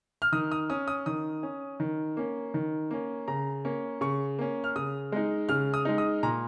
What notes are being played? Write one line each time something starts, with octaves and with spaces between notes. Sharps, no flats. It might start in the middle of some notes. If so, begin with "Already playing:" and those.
F6
D#3 D#6
D#6
C#4 D#6
D#6
D#3 D#6
C#4
D#3
A#3 C#4
D#3
A#3 C#4
C#3 A#5
A#3 C#4
C#3 C#6
A#3 C#4
F6
C#3 D#6
G#3 D#4
C#3 F6
D#6
G#3 D#4
D#6
A#2 A#5